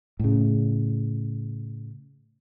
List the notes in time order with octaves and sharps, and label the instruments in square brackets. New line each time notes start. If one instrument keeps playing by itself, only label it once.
[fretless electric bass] A2 C#3